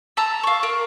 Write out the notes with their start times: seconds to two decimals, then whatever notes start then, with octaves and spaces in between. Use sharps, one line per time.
0.17 A5 A#5 E6
0.43 F5 C#6
0.63 A#4